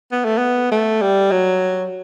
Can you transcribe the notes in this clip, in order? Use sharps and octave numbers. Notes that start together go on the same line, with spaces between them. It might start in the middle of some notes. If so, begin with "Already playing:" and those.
B3
A3
B3
A3
G3
F#3